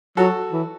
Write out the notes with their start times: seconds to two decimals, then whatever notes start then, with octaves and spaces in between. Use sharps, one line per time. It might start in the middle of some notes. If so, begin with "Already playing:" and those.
0.17 F#3 F#4 A4
0.52 E3